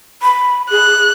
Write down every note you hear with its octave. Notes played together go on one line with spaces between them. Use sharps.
B5
G#4 F#6